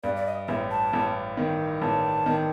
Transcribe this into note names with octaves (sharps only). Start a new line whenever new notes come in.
G2 D5
D5
D#5
A1 E5
A5
A1
D#3
A1 A5
D#3